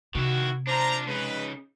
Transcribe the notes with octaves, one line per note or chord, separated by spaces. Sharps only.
C3 D#3 E4 F#4
D4 F4 C5 A#5
C#3 G#3 D#4 B4